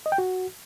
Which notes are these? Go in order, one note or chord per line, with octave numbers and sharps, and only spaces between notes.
D#5
G5
F#4